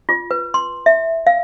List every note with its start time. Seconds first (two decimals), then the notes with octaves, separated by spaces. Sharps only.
0.09 F4
0.31 B4
0.54 C6
0.86 E5
1.27 F5